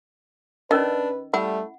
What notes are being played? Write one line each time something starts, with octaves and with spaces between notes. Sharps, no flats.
D#3 C#4 D4 A#4 B4 D#5
G3 A3 E4 F#5